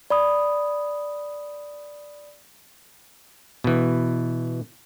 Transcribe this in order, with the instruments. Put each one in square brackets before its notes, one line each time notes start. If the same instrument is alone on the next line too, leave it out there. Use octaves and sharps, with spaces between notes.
[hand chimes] D5 B5 D#6
[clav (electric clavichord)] B2 E3